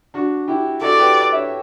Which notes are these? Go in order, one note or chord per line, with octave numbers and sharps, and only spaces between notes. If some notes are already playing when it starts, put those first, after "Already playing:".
D4 F#4
E4 G4
F#4 A4 D5
G4 B4
C#5 E5